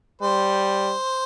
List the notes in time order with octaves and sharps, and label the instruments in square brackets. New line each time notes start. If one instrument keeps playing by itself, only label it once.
[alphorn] G3 [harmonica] C5